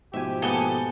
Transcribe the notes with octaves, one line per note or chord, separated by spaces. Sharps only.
G#2 B2 F3 G4 E5 G#5
A#3 B3 A4 D#5 G#5